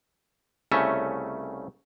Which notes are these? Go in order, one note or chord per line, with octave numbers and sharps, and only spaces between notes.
C2 C#3 A3 C#4 E5